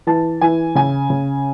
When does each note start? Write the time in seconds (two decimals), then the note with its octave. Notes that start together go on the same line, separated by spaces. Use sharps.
0.07 E3 A5
0.41 E3 G#5
0.75 C#3 G#5
1.10 C#3